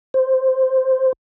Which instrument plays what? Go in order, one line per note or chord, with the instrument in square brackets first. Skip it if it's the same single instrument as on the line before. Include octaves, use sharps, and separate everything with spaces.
[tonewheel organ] C5